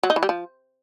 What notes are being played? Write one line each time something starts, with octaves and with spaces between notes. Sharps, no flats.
F#3
D#4
E3
G3
F3